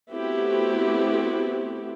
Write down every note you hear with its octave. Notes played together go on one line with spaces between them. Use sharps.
A3 B3 C4 E4 F#4 G4